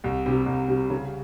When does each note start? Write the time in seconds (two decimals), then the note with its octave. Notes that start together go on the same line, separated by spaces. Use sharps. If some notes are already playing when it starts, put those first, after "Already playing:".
0.04 C2
0.26 C3 G3
0.46 C2
0.68 C3 G3
0.90 C#3